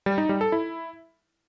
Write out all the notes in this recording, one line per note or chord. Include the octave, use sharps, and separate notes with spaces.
G3
D#4
G3
A4
E4